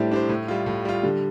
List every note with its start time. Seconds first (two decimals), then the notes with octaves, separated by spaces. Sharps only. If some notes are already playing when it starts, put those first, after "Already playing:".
Already playing: A2 G3 D4 G4 C5
0.11 D4 G4 C5
0.29 A2
0.48 G3 F4
0.66 A2
0.85 G3 F4
1.03 D3 G3